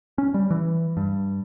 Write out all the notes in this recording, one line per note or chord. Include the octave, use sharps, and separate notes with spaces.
C#4
G3
E3
G2